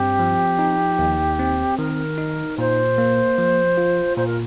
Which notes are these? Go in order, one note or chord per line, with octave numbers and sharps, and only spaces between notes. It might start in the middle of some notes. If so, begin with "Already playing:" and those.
Already playing: G2 C4 G4
F3
D#4
D#2
C4
D#3 A#4
D#4
A#2 C5
A#3
F3
F4
A#2 C5
A#4